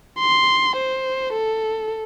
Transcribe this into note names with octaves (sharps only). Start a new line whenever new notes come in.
C6
C5
A4